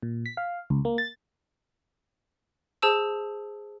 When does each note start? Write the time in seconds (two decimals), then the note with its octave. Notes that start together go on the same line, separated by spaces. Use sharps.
0.03 A#2
0.26 B6
0.37 F5
0.70 C#2
0.85 A#3
0.98 A6
2.82 G#4 C5 A5 E6